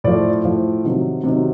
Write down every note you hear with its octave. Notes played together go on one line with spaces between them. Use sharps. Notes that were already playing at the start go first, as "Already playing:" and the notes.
A2 F3 D5
A2 F3
C3 D#3 F#3
C3 D#3 F#3